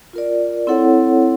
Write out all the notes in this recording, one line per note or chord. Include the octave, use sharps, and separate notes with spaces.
F4 A#4 D5
C4 E4 A4 C#5 F#5